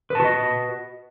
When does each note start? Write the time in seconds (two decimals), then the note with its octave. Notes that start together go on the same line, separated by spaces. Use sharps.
0.10 B4
0.15 A5
0.20 F#4
0.24 D#5